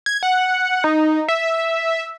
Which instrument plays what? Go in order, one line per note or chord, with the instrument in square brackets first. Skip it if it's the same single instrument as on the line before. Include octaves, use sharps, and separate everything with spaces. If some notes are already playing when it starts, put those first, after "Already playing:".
[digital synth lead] G#6
F#5
D#4
E5